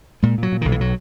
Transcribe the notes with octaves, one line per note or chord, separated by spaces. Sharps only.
A#2 G#3
A#2 F#3
A#2
B1 D#3
E3
F#3